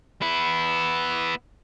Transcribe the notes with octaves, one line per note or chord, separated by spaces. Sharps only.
B3 E4